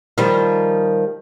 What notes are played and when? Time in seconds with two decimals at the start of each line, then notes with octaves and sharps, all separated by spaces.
0.18 D#3 F3 G3